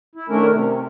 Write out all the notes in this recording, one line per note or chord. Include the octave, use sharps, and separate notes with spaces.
E4
D#3 A3 C#4 D4 A#4
C3